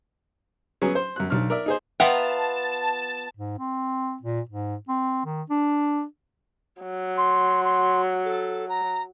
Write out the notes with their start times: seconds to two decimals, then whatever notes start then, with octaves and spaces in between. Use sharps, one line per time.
0.81 F#3 B3 C#4 G#4
0.95 C5
1.16 F#2 F#6
1.30 B1 D4 F6
1.50 A#4 D5 E5
1.66 D#4 G#4 C5
2.00 B3 F4 E5 F#5 G5 A5 A#5
3.37 G#2
3.58 C4
4.22 A#2
4.49 G#2
4.89 C4
5.25 D#3
5.50 D4
6.82 F#3
7.17 C6
7.65 C6
8.25 A4
8.69 A#5